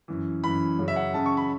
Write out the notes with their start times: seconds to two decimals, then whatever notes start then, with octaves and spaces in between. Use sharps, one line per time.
0.08 F#2 E3
0.43 F#2 E3 B5
0.78 F#2 C#3 F#3
0.88 E5
0.96 F#5
1.14 F#2 C#3 F#3 A5
1.26 C#6
1.37 B5